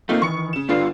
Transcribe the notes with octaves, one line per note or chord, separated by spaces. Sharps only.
A3 A#3 C4 D#4 F4
D#3 E3 C#6 C#7
C#3 E7
G2 D3 G3 B3 F4 F5